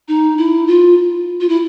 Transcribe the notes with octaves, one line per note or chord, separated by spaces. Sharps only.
D#4
E4
F4
F4
E4